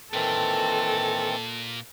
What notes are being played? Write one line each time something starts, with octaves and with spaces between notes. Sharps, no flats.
A#2 D#3 E3 C4 A4